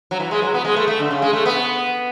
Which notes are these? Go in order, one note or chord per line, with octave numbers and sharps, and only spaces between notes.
F#3
E3
G#3
F#3
B3
G#3
A3
A3
D3
C#3
G#3
A3
B3